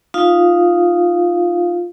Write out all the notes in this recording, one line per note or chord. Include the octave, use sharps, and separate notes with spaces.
D#4 F4 F5